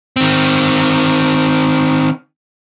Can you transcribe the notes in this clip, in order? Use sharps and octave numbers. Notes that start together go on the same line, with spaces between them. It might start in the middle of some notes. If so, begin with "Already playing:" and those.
D#3 C4